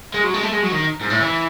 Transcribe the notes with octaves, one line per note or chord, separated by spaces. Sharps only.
G#3
F#3
G#3
A3
G#3
F#3
D#3
G#2
A2
E3